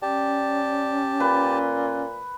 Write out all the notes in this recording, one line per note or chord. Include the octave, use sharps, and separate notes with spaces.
G3 C#4 G4 A5
A#2 B4